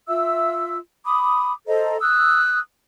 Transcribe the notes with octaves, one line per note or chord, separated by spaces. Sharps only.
F4 E5 E6
B5 D6 D#6
A4 C5 D#5 A#5
D#6 E6 F#6